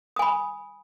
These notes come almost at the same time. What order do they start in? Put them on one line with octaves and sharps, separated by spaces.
D#6 G#5 B5